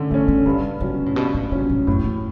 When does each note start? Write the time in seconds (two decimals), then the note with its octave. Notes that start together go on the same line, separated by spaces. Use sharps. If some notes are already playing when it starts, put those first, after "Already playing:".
Already playing: D3 A3 C#4
0.10 E3 A3 C#4
0.28 D3
0.46 G2 C#3
0.81 C#3 F#3 C#4
1.06 A2
1.16 G2 B2
1.34 A2
1.52 C#3 F#3 C#4
1.70 A2
1.87 F#2 A2
2.05 E2